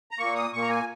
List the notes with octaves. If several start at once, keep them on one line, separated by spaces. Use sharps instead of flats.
A#5
A#2 A#3 C#6
D#6
A#2 A#3 C#6
A#5
G#5